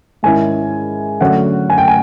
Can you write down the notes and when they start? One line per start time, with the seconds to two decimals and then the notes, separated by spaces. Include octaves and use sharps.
0.23 G#2 D#3 G#3 C#4 E4 G#5
1.21 D3 F#3 A3 C#4 F#5
1.70 G#5
1.78 G5
1.88 G#5